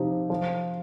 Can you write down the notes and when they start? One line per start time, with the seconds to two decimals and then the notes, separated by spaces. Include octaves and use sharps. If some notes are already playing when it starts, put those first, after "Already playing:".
Already playing: C3 F3 C4 D#4 G4
0.30 F3